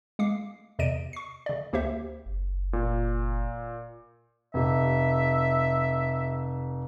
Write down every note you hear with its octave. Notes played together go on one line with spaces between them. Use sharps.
G#3 F5 D6 C7
E2 C3 D5 D#5 D7 D#7
C#6 C7
C#3 D5
D2 A#3 G4 C5 E5
F#1
A#2
F1 G4 E5